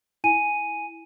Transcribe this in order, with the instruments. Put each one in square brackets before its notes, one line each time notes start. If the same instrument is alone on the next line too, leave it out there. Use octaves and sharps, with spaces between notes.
[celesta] E4 G#5 D#7